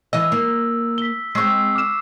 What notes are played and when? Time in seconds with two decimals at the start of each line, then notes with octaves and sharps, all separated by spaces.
0.13 E3 D#5 E6
0.32 A#3
0.98 B6 G7
1.35 G#3 C4 C#6 E6 C7
1.75 D6 F6 E7